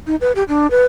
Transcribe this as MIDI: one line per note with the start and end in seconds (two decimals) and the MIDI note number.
0.07 0.15 63
0.21 0.32 71
0.35 0.43 67
0.48 0.67 62
0.71 0.86 71